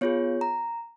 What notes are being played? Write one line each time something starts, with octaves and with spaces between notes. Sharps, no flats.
B3 F4 G#4 C#5
A#5